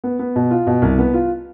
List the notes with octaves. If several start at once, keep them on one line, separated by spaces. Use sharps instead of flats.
B3
B3
B2
F4
B2
C2
B3
F4